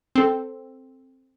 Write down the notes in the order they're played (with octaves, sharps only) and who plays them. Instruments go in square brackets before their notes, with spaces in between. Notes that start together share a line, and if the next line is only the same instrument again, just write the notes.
[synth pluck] C4 A4